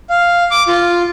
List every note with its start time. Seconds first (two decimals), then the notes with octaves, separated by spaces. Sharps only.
0.10 F5
0.51 D6
0.68 F4